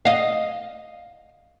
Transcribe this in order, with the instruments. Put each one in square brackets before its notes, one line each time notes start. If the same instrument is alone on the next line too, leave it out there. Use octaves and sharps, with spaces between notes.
[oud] D#5 F5